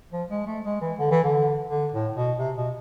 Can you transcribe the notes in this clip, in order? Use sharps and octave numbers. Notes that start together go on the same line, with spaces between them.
F3
G#3
A3
G#3
E3
D3
E3
D3
D3
A2
B2
C3
B2